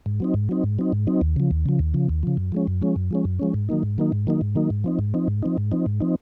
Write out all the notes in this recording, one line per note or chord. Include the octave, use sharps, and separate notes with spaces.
G#2
F#3 C4 D#4
G#2
F#3 C4 D#4
G#2
F#3 C4 D#4
G#2
F#3 C4 D#4
D#2
C#3 F3
D#2
C#3 F3
D#2
C#3 F3
D#2
C#3 F3
F#2
F3 G#3 C#4
F#2
F3 G#3 C#4
F#2
F3 G#3 C#4
F#2
F3 G#3 C#4
G#2
D#3 F#3 A#3 D#4
G#2
D#3 F#3 A#3 D#4
G#2
D#3 F#3 A#3 D#4
G#2
D#3 F#3 A#3 D#4
G#2
F3 C4 D#4
G#2
F3 C4 D#4
G#2
F3 C4 D#4
G#2
F3 C4 D#4
G#2
F3 C4 D#4